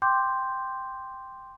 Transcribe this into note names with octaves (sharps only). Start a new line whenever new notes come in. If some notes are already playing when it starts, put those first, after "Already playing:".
G5 C6 D6 G6